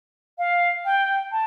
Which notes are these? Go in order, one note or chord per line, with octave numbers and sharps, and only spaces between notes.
F5
G5
A5